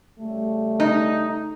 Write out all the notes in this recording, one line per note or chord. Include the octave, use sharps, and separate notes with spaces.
C#3 G3 A3
D#4